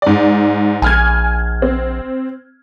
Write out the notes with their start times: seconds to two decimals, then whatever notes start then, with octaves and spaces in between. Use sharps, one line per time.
0.02 G#2 D5
0.82 A#1 G#5 F6 G#6
1.62 C4